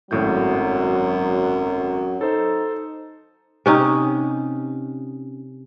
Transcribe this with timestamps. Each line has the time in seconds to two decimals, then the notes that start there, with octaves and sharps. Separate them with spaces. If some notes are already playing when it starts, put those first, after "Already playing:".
0.11 G#1 F#2 A2 F#3 G6
2.21 D#4 A4 C5
3.66 C3 C#4 D#4